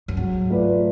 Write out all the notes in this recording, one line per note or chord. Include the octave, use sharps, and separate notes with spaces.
F#2
G#2 F#3
A3 F4 B4 D5